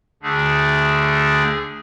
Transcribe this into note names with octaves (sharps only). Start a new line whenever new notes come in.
D2 D3 A3 D4 G#4